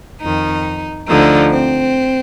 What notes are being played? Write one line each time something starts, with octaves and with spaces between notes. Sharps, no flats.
F2 D#3 D#4
D2 D3 F3 D#4
C4